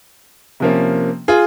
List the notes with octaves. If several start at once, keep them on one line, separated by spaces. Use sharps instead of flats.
C3 F3 A#3 C#4
F4 G#4